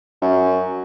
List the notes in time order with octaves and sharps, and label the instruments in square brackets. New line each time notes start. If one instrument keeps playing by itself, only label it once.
[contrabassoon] F#2